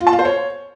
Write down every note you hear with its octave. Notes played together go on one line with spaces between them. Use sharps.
F4
A5
F5
C5
C#5